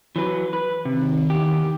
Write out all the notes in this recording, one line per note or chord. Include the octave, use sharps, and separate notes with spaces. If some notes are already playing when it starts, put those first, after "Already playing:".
E3 F#3 B4
B4
C3 D#3
E2 G4